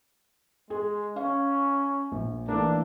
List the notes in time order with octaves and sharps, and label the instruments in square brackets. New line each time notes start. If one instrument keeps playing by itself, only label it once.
[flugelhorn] G#3 [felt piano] G#4
[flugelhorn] C#4 [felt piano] F5
[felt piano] A#1
[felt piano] E3 A3 A#3 [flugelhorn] D4